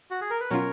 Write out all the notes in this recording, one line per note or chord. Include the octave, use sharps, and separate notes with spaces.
F#4
G#4
A#4
B4
B2 F#3 C#4 F4 A#4 C#5